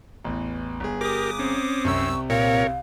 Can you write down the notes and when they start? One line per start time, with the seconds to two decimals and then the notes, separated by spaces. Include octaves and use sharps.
0.24 A1 E2
0.80 G1 G#4
1.01 G4 A#4 D6 D#6
1.39 C4 C#4
1.85 C2 F#2 C3 C#6 E6
2.30 A#2 C4 A#4 C#5 F5